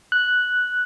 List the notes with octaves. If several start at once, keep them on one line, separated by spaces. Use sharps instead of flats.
F#6